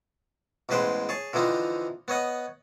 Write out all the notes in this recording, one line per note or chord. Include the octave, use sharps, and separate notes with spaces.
A1 E2 G#3 B4 C5 G5
G#4 C#5 A5
D3 E3 F3 C4 D#4
B3 C#5 D#5 F#5